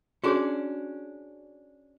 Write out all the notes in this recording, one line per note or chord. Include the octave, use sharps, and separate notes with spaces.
C#4 D4 F#4 G#4 C#5